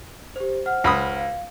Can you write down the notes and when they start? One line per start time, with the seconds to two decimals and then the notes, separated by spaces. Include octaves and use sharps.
0.36 G4 C5
0.66 C5 F#5 F6
0.84 C#2 B5 D#6
1.17 F5